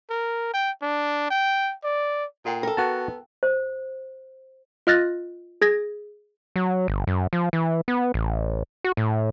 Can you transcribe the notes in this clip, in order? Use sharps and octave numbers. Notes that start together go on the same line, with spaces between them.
A#4
G5
D4
G5
D5
A#2 A4 F#5 G5
A4 A#4 G5
B3 F#4 A5
C5
F4 D#5 F6 F#6 A6 A#6
G#4 G#6 A#6
F#3
G1
F#2
F3
E3
B3
A1
F#4
A2